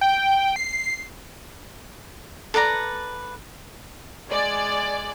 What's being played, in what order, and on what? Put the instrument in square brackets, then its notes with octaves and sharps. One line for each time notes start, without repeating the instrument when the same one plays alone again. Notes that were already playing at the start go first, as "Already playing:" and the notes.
[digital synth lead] G5
C7
[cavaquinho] A4 B4 D5 A#5
[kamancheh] G#3 G#5 [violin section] D5